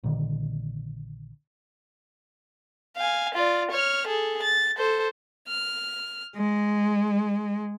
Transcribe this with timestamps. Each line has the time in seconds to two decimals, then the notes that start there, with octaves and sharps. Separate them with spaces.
0.03 A#1 A#2 D3 D#3
2.97 F5 G#5
3.35 F4 D5
3.71 C#5 F6
4.07 G#4 A4
4.43 A6
4.78 A4 C5
5.49 F6
6.35 G#3